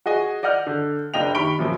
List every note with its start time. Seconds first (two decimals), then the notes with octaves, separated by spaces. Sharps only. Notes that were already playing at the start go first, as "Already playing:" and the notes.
0.06 F#4 G#4 D#5 G#5
0.43 D5 D#5 F#5 F6 G6
0.67 D3
1.14 F#1 D4 D#5 G5 F7
1.35 D#3 G4 B5 C#6 D7 G7
1.59 F#2 A#2 F3